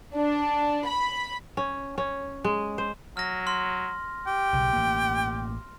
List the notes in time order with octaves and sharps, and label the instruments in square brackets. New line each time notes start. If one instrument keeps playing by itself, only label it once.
[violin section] D4
B5
[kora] C#4
C#4
G#3
C5
[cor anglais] F#3 [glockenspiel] F6 A#6
[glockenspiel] C6 F6
[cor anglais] G4 [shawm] G5
[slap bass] B1 C#3
A1 A#3